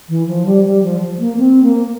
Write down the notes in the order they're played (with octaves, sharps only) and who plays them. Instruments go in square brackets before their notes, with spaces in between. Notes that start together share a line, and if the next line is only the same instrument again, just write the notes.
[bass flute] E3
F3
G3
G3
F3
F3
A#3
C4
A#3